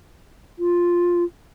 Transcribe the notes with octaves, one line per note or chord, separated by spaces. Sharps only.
F4